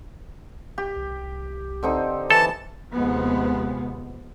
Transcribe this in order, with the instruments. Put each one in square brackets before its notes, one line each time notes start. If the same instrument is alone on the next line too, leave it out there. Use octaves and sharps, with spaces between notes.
[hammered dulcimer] G4
[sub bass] C2
[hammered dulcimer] D3 C4 D#4
[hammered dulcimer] E3 [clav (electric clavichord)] A4 [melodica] A5
[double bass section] D#2 C3 F3 G#3 B3